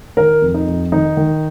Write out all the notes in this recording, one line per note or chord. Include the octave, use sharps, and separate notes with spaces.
D#3 A#4
F2
D#4
F2
D#3 D#4
D#3